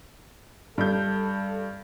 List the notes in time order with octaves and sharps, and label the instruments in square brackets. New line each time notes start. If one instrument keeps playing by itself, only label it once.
[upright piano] G2 G6 [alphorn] A4